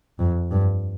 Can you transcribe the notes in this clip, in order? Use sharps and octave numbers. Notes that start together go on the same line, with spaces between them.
F2
G2